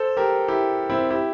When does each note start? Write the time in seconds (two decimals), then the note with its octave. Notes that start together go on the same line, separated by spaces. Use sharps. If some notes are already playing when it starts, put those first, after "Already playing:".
Already playing: A4 C5
0.17 G4 A#4
0.48 E4 G4
0.89 C4 E4
1.10 E4 G4